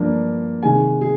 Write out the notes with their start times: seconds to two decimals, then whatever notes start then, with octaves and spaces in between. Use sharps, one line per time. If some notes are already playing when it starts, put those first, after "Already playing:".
Already playing: G2 F3 A#3 D4
0.63 C3 D#3 G#3 G#5
1.01 G#4